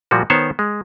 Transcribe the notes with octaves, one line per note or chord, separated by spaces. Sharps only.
A#2 F3 G3 A#3 F#4
D#3 B3 C5 C#5 A5
G#3